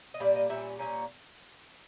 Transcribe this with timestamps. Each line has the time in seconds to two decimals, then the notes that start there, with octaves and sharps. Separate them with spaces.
0.14 D#5
0.20 A#2 G3 A#3 D5
0.36 D#5
0.49 A#2 G3 C#4 E5
0.79 A#2 G3 A#3 C#4